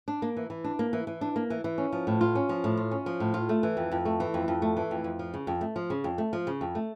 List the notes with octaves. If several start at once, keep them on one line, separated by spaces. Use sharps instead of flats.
D4
A#3
E3
E3
D4
A#3
E3
E3
D4
A#3
E3
E3
C#4
F3
A2
F4
C#4
F3
A2
F4
C#4
F3
A2
F4
A3
E3
F2
F2
A3
E3
F2
F2
A3
E3
F2
F2
F3
C#3
F2
A3
F3
C#3
F2
A3
F3
C#3
F2
A3